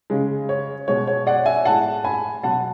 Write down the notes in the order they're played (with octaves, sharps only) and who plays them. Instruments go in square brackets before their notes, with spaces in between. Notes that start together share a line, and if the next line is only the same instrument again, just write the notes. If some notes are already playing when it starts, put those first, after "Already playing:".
[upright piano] C#3 G#3
C#5
B2 G#3 C#5
C#5
D5 F#5
E5 G#5
A2 G#3 F#5 A5
G#5 B5
B2 F#3 F#5 A5